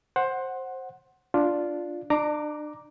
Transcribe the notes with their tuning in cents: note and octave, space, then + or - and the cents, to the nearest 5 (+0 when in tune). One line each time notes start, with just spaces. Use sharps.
C5 +15 F#5 +0
D4 +0 F4 +0
D4 +35 A#5 +0 D6 +0